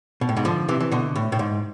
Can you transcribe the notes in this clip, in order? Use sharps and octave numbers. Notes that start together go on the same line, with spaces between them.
B2
A2
G#2 B2
D3 F3
C3 E3
E3
B2 D3
A2
A2
G#2